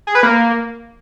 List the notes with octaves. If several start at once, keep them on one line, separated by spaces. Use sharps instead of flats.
G#4
B4
A#3